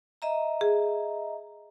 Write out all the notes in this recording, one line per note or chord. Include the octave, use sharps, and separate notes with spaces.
D#5 E5 A#5
G#4